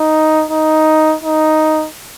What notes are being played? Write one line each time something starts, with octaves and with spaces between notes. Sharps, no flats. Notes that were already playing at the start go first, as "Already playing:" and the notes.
Already playing: D#4
D#4
D#4